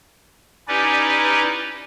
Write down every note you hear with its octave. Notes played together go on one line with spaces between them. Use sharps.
C#4 D#4 E4 G4 B4 D5